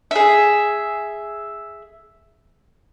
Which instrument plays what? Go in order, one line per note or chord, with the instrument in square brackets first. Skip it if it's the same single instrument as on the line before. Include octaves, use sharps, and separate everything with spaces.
[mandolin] G#4 E5